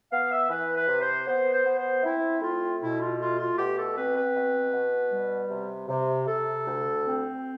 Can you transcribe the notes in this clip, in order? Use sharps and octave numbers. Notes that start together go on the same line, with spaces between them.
B3 F5
E5
E3 B4
B4
C3
C5
B3 C5
C5
B3
C5
C4 E4
A3 F4
B2 E4
F4
A3 F4
F4
B2 G4
A4
C4 B4
B4
B2
B2
G3
C3
C3
C3 A4
D2
C4